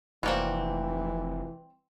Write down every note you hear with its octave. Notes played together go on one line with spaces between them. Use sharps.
F1 E3 G3 A#3 C4 F#4